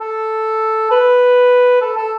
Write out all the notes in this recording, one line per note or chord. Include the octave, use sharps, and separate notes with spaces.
A4
B4
A4
A4